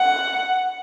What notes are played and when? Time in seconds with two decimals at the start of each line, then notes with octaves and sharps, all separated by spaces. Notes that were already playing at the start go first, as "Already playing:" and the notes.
Already playing: F#5